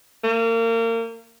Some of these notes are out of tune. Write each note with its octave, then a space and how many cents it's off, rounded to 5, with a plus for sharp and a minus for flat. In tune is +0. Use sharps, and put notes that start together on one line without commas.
A#3 -30